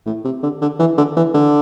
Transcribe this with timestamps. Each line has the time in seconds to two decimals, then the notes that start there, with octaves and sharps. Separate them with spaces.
0.06 A2
0.24 C3
0.43 D3
0.61 D3
0.79 E3
0.97 D3
1.16 E3
1.34 D3